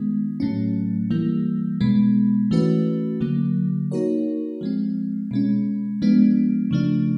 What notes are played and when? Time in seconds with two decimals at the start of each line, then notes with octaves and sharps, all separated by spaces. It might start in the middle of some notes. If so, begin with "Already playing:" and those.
Already playing: D#3 G#3 B3
0.40 A2 F#3 A3 C#4
1.11 E3 G3 A#3
1.81 B2 G#3 B3
2.51 E3 A3 C#4 F#4 B4
3.21 D3 F#3 A#3
3.92 A#3 D#4 F#4 A#4 C#5
4.61 F3 G#3 C4
5.31 B2 G#3 C#4
6.02 F3 G#3 B3 D4
6.71 C#3 F3 A3 D4